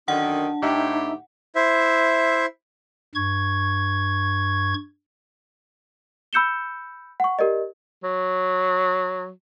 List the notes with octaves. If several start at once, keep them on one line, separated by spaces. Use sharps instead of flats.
F#2 D3 D#3 D4 F#5
A2 D#4 G4 E5
E4 C5 E5
G2 C#6 G#6
B5 E6 G6 C#7 E7 G7
F#5 C#6
G4 A#4 D5 D#5
F#3